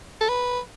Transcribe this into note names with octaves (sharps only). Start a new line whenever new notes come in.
A4
B4